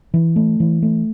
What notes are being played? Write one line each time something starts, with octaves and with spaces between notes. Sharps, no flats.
E3
A3
E3
A3